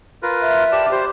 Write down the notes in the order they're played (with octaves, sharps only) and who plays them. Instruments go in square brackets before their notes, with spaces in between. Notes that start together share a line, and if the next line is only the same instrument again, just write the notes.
[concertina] F4 A#4 B4
[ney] E5
[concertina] G4 D5 A5
[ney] G4 [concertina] C5